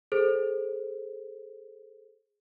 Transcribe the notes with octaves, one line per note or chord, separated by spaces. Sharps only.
G#4 A4 C5